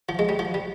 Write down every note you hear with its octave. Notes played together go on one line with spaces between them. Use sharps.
F3
G#3
G3
F3
G3